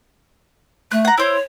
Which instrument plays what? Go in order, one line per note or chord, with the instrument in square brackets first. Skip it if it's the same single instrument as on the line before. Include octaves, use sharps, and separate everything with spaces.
[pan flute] A3 [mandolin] F#6
[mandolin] F#5 A#5
[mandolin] E4 C5 [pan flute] C#5